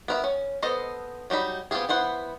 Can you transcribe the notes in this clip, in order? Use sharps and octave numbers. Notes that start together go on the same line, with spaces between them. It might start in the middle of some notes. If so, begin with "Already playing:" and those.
B3 A#4 E5
C#4
B3 A4 C5 D#5
F#3 G3 D#4 B5
B3 C4 F4 G4 G#4
E3 B3 C5 F#5